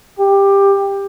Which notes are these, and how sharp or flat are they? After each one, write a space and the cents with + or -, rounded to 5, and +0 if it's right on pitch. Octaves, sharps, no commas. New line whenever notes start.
G4 +15